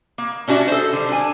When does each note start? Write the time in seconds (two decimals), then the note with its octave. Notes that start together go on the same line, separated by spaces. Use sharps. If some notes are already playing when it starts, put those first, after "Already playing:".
0.18 A#3
0.48 C#4 D4 F#4 D5 E5
0.68 A4 C5
0.93 D3 G3
1.09 D4 G#5